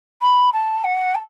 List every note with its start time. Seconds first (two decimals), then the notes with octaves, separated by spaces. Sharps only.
0.21 B5
0.53 A5
0.84 F#5
1.14 A5